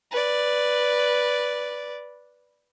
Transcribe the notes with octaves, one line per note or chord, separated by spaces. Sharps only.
B4 D5